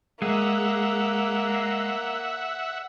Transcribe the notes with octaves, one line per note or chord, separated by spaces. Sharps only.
G#3 A#3 E5 F#5